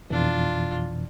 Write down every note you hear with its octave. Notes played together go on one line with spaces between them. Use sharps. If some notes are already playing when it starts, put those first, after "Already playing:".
F2 B2 E3 D4 F4